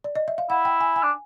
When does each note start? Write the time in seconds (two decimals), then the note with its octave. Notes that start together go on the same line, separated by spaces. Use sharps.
0.04 D5
0.15 D#5
0.28 E5
0.38 F5
0.50 E4 F#5
0.65 G5
0.81 G#5
0.96 G#5
1.03 D4